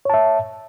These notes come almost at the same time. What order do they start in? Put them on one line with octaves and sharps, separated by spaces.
C#5 A5 E5